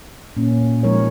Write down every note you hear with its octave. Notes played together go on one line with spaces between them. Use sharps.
A#2 A#3 C#4
F3 G#3 D#4 A#4 C#5